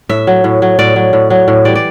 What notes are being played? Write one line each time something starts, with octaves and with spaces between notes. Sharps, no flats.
A2 E5
F#3
A2
F#3
A2 D5
F#3
A2
F#3
A2
E3 G3 D5
D5